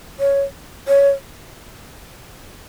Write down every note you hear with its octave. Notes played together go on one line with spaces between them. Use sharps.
C#5
C#5